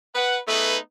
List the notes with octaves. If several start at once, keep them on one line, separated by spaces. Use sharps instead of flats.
B4 F#5
A3 B3 D#4 G#4 B4